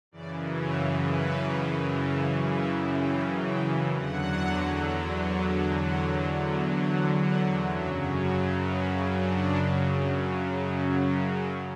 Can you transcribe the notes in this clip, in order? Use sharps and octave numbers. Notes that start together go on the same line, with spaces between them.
F#2 C#3 E3 D5
C#5
B4
C#5
E5
G5
G5
E2 D3 F#3 F#5
F#5
F#5
F#5
F#2 C#3 F#3 E5
C#5
B4
D4
C#4
C#4